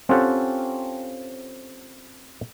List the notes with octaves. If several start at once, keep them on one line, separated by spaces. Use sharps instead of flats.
C4 C#4 F4 G4 A4 F#5